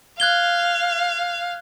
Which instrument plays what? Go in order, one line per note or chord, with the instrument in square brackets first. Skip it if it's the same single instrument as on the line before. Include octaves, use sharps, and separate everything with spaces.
[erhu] F5 [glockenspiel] F#6 G#6 G7